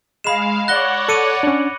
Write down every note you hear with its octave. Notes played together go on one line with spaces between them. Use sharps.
G#3 F5 B5 E7
C#5 D5 F#5 F#6 A#6 G7
A4 D6 C#7 D#7
C#4 D4